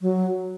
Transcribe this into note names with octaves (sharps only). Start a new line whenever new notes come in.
F#3